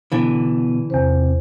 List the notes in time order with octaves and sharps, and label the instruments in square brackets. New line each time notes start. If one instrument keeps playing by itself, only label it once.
[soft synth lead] B2 [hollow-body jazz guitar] D3 E3
[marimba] E2 C5 [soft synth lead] C3